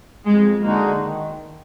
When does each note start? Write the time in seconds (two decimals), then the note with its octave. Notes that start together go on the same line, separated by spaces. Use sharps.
0.25 F2 G#3
0.62 D3 G#3 A#3 D#4 F#4
1.00 D#3